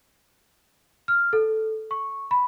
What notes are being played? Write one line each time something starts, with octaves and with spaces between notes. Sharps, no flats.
F6
A4
C#6
B5